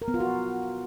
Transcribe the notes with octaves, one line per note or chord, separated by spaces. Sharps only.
A#4
B3
F4
F#4